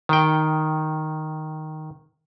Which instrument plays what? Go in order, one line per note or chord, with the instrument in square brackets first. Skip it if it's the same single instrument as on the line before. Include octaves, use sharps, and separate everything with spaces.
[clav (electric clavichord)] D#3 G5